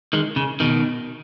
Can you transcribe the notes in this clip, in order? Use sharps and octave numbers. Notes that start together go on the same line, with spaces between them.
D#3 G#3
C#3
B2 D#3